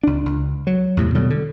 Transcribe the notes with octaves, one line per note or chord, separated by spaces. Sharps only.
C#2 D4
C#2
F#3
E2 A2 C3
B2 D3 F#3 G3
D3